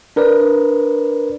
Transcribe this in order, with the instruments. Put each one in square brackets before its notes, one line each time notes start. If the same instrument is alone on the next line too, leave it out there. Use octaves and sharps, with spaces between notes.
[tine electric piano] D4 A#4 B4 D5